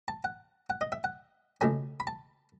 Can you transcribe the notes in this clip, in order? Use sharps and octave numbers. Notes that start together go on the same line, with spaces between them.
A5
F#5
F#5
D#5
E5
F#5
C#2 B2 A3 C#4 G#5
B5
A5